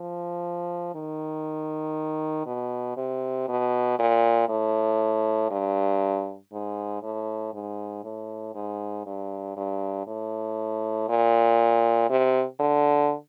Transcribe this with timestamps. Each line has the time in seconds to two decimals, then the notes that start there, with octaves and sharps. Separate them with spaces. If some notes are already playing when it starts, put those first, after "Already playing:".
Already playing: F3
0.95 D#3
2.46 B2
2.97 C3
3.48 B2
3.99 A#2
4.49 A2
5.51 G2
6.53 G#2
7.02 A2
7.54 G#2
8.04 A2
8.55 G#2
9.06 G2
9.57 G2
10.07 A2
11.09 A#2
12.10 C3
12.60 D3